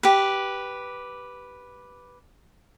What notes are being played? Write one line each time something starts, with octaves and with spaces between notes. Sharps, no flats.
G4 B4